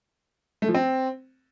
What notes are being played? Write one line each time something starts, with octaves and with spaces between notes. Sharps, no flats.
A3
F3
C4